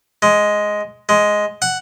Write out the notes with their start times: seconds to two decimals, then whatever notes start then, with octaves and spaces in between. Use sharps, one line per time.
0.22 G#3
1.09 G#3
1.62 F#5